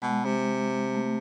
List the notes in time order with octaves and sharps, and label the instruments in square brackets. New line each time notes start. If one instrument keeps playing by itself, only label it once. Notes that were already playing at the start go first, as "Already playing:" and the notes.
[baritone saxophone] B2 [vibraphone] G#3
[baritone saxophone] C3
[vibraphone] A3